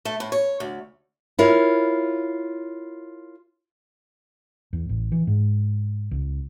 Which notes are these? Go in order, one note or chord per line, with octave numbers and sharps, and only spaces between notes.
A3
A2
C#5
D2
E4 F4 A#4 C#5
E2
A1
E3
G#2
C#2